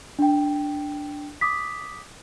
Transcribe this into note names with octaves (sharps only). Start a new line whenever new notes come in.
D4 G5
D6 D#6 B6